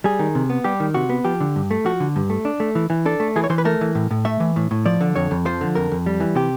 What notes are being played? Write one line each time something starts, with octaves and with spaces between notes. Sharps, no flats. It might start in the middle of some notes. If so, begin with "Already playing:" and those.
G3 G#4
D#3
C3
B3
G3 G4
D#3
C3 F#4
B3
F3 G4
D3
G2
A3
F3 F#4
D3
G2
A3
D4
A3
E3
E3
D4 A4
A3
E3 G#4
C#5
E3 C5
B4
A3 A#4
E3
A2
A2
A3 E5
E3
A2
A2
F3 D5
D3
F2 C#5
F2
F3 C5
D3
F2 A#4
F2
G3
E3
C3 G4